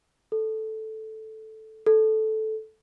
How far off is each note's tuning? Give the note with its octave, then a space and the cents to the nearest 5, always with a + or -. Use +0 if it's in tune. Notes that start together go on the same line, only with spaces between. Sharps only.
A4 -5
A4 -10